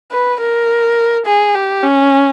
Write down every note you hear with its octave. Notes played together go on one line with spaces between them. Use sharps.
B4
A#4
G#4
G4
C#4